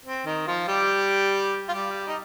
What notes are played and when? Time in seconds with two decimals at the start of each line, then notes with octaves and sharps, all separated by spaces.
0.06 C4
0.26 D#3 D#4
0.47 F3 F4
0.68 G3 G4
1.69 F4
1.73 G3 G4
2.07 D#4